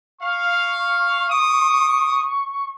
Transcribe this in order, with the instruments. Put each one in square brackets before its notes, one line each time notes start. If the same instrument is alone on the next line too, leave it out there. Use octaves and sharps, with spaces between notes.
[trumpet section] F5 [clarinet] C#6
[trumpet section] D6 D#6